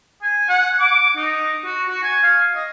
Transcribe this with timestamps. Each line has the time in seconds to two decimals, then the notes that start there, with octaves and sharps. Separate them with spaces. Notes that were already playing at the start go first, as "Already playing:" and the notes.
0.23 G#5
0.49 F#5
0.80 D6
1.16 D#4
1.65 F#4
1.89 F#4
2.03 G#5
2.23 F5
2.55 D#5